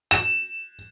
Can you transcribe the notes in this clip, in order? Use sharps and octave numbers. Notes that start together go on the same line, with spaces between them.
E7